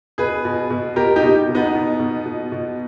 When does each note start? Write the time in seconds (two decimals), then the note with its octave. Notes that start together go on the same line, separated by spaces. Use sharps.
0.18 B2 G#4 B4
0.45 B2
0.71 B2
0.96 B2 G4 A#4
1.16 D#4 G4
1.23 B2
1.49 B2
1.55 B3 D#4
1.75 B2
2.00 B2
2.26 B2
2.52 B2